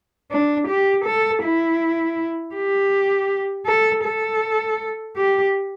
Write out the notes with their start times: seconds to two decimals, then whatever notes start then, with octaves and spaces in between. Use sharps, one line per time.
0.31 D4
0.68 G4
1.05 A4
1.43 E4
2.55 G4
3.66 A4
4.04 A4
5.16 G4